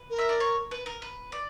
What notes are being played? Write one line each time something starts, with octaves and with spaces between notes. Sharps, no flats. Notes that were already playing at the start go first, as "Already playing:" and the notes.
Already playing: B4
A#4
E5
D5
C#5
B4
A#4
B4
D5